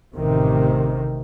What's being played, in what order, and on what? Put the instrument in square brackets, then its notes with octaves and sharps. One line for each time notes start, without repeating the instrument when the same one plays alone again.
[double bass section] A1 C3 D#3